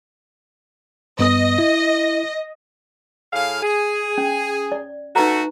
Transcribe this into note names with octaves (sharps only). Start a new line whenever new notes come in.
G2 B3 D#5 D#6
E4
A2 G#4 F5
G#4
C#4
D5
A3 D#4 F#4 B4 A#5